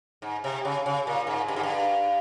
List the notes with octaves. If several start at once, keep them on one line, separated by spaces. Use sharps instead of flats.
G#2
C3
C#3
C#3
A#2
G#2
G2
G#2
G2